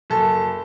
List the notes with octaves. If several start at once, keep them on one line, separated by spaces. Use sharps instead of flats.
F#1 A4